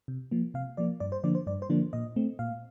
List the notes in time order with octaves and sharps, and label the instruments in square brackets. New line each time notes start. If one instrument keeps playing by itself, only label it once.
[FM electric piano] C3
F3 A#3
C3 F5
F3 A#3 D5
G2 D5
C5
D3 F3 A#3 D4 D5
C5
G2 D5
C5
D3 F3 A#3 D4
A#2 D#5
A3 C4
A#2 F5